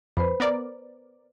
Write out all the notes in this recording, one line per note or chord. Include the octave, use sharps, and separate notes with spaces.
F2 B4 C5 B5
B3 A#4 D5